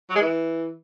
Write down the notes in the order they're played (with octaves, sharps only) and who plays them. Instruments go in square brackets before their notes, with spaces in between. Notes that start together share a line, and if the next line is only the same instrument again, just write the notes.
[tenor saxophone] F#3
G#3
E3